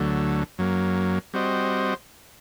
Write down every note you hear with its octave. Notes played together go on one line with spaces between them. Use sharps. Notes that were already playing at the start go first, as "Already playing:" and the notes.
Already playing: D2 D3 F#3 A3
F#2 F#3 A#3
G3 C4 F#4 C5 D#5